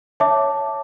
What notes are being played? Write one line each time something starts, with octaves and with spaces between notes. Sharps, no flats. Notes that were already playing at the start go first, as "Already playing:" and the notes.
C#5 E5 A5 D6